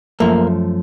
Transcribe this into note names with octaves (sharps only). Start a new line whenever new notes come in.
F#2 F3 A3 A#3